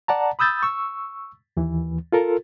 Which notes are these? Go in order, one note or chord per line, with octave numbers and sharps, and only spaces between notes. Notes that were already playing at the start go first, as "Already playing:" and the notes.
D5 F#5 A5 A#5
B5 D#6 E6 G6 A6
C#6 E6
D#2 E3
F4 A4 A#4